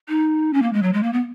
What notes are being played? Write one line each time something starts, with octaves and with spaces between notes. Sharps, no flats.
D#4
C#4
A#3
G#3
F#3
G#3
A#3
B3